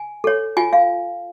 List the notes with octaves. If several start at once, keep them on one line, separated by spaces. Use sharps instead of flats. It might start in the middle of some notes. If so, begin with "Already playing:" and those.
Already playing: G#5
A4 C#5
F4 G#5
F5